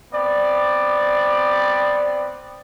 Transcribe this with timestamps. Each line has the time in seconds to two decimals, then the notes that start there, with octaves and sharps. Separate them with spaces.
0.13 B3 C4 D5